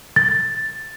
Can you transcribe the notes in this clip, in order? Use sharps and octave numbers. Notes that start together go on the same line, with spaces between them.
A6